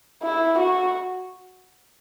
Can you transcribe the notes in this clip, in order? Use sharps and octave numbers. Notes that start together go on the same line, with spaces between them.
E4
F#4